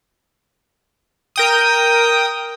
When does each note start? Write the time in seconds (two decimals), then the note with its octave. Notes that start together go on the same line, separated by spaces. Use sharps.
1.36 A#4 G5 D#6